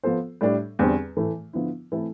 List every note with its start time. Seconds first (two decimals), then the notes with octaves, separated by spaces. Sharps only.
0.04 F3 B3 F4 A4 C5
0.41 A2 G3 D4 A4
0.79 E2 D3 G3 C4
1.17 A2 E3 A3
1.53 D3 F3 B3 E4
1.92 E3 A3 C4 E4 A4